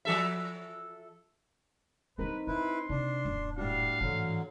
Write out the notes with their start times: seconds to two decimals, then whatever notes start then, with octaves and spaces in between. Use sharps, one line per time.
0.05 F3 A4 E5
2.18 G3 C4 D4 D#4 A#4 B4
2.47 D4 E4 B4 C6
2.89 C3 D4
3.25 D#1 F#2
3.57 A2 G3 D4 F#4 F5
4.01 G#2 D3 E3 F#3